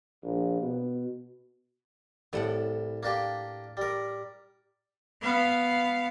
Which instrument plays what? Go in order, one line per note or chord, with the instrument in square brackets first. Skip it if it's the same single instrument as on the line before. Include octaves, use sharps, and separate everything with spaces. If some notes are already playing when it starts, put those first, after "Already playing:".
[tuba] A#1
B2
[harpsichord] C2 [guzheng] A2 A4 F#5
[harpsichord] A#3 D4 G4
G3 A#4
[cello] B3 F5